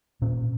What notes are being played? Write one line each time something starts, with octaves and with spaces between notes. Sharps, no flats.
A#2 C#4